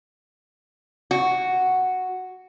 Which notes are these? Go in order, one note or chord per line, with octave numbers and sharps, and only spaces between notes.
F#4